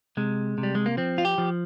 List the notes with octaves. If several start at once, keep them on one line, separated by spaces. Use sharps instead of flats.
C3 G#3
C3
G3
G#3
A#3
F3 C4
F4
G4
F3